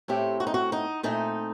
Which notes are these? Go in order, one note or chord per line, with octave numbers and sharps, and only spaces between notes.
A2 A3 C4 G4
F#4
D#4
F#4
D#4
A#2 A3 C4 D#4